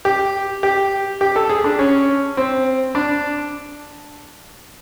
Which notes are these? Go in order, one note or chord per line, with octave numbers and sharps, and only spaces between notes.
G4
G4
G4
A4
G#4
D4
C#4
C4
D4